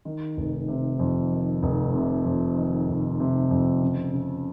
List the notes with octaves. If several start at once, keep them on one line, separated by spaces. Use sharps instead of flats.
D#3
F1
C3
F2
D#3
F1
C3
F2
D#3
F1
C3
F2
C#3
C#3